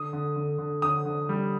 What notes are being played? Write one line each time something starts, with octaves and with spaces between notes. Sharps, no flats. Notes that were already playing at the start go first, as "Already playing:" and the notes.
Already playing: D3 D#6
D3
D3
D3
D3 D#6
D3
G3